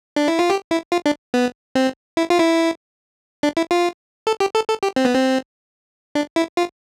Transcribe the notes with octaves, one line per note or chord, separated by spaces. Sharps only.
D4
E4
F4
G4
E4
F4
D4
B3
C4
E4
F4
E4
D4
E4
F4
A4
G4
A4
A4
G4
C4
B3
C4
D4
E4
F4